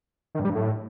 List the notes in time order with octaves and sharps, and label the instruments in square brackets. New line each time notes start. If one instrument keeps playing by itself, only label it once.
[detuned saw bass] D#3
G2
G3
G2
A2